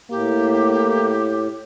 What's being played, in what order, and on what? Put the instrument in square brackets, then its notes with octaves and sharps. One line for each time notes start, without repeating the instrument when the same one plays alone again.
[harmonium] A2 [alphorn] A#3 [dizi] G4